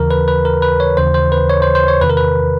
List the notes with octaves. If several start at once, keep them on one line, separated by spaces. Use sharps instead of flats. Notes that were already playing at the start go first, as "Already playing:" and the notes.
Already playing: D#2 C#3 E3 A#4
B4
B4
A#4
B4
C#5
D#2 C#3 E3 C5
C5
B4
C#5
C5
C5
C#5
E2 C3 D#3 B4
A#4
B4